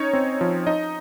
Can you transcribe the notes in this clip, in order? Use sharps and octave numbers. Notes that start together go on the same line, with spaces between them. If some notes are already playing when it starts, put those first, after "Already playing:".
Already playing: C#4 D#4 C#5
C4
F3
D#4 D#5